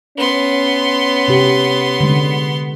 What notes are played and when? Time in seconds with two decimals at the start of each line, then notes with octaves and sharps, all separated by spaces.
0.18 B3 C#4 C6
1.28 C3 G4
2.00 D3 G#3